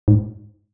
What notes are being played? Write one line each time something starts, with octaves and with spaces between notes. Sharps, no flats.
G#2